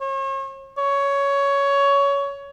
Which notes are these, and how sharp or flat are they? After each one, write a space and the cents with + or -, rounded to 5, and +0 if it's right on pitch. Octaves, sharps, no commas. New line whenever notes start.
C#5 -40
C#5 +15